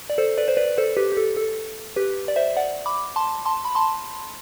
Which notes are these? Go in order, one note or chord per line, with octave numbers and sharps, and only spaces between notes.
D5
A4 C5
B4 D5
C5
B4 D5
A4 C5
G4 B4
G4
A4
A4
G4 B4
D5
C5 E5
D5 F#5
B5 D6
A5 C6
A5 C6
B5
A5 C6